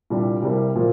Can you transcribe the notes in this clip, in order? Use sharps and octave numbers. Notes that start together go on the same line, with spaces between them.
C2 A#2 G3 D4
C2 C3 G3 A#3 G4
A#2 F3 A#3